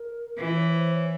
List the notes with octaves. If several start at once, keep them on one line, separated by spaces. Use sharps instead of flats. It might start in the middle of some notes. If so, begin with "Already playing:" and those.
Already playing: A#4
A#4
E3 B4
C#5
C5
C#5